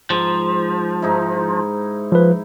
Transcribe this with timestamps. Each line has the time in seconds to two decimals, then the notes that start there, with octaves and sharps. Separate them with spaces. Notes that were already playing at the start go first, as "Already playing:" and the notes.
0.10 G#2 F3
1.02 G#2 D#4 E4
2.12 F3 B4